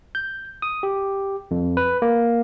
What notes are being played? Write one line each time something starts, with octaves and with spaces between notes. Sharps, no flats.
G6
D#6
G4
F2
B4
A#3